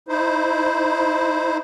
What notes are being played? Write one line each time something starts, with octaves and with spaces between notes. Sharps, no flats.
D#4 E4 C5